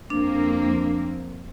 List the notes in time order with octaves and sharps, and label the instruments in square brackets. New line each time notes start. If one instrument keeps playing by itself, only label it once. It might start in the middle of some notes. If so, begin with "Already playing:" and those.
[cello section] F2 A#3 C4 [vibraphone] D4